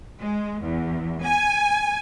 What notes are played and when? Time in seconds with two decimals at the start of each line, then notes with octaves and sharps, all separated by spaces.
0.21 G#3
0.63 E2
1.22 G#5